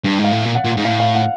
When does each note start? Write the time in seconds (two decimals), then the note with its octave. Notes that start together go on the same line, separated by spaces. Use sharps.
0.04 G2
0.19 G#2
0.24 F5
0.32 A2
0.45 A#2
0.55 F#5
0.65 A#2
0.77 G#2
0.85 A2 F5
1.00 F5
1.15 F#5